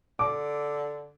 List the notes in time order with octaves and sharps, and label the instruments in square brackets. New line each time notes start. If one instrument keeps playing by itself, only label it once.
[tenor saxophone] D3 [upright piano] D6